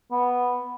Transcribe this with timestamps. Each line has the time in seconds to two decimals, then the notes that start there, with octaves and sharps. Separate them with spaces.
0.11 B3